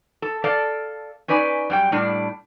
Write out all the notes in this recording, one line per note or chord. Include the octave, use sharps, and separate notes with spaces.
A4
A4 D5 F5
C#4 D#4 B4 D5 G#5
F#2 G3 G5
A2 G3 D4